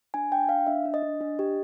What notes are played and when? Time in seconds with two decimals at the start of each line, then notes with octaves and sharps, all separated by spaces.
0.14 D4 G#5
0.32 D4 G5
0.49 D4 F5
0.67 D4 E5
0.85 D4
0.94 D#5
1.03 D4
1.21 D4
1.39 G4